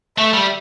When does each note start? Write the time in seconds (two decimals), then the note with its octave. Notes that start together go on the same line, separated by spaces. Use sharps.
0.18 A3 E5
0.33 G3